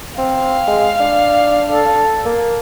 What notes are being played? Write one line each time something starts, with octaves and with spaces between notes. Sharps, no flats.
C4 F5
G#3
D4
A4
A#3